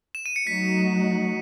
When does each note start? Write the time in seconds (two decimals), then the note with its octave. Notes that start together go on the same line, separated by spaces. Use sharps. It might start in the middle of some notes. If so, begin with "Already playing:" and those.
0.15 E7
0.26 D#7
0.36 C#7
0.47 F#3 A3 D#4 F#4 B6